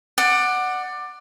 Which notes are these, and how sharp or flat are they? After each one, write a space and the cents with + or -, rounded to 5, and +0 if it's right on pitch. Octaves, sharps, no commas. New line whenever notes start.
D5 +20 F#5 +0